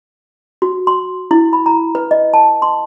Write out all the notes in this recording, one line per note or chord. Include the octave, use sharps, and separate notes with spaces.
F#4
C6
E4
B5
A#5
B4
D#5
A5
C6